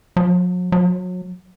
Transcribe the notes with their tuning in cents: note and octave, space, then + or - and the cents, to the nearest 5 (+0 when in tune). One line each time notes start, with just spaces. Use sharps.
F#3 -45
F#3 -30